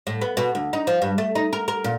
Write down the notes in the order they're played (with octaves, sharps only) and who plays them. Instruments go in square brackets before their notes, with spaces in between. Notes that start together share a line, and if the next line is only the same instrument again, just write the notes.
[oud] A2
B3
B2
D2
D#4
F3
G2
A3
D#4
A#4
A#4
A#2